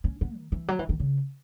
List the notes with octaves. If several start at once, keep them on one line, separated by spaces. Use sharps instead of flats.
C#4
B3
D#3
E3
F#3
E3
D#3
C#3